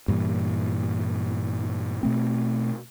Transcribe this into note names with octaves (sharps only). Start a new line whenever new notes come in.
G2 A#2 E3
B2 A3 C4